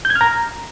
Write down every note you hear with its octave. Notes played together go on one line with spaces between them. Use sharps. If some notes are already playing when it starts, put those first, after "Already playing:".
G6
G#6
F6
A#5